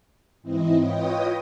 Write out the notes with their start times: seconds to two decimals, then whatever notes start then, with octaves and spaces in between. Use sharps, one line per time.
0.42 G#2 E3 C4 E4 D#5
0.79 F4 B4 C#5 D#5 G5 D#6